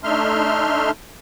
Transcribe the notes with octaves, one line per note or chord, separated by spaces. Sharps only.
A3 D4 D#4 E5 C6 F6